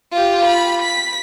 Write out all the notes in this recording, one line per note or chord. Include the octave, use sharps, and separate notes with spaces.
F4 G4
B5
B6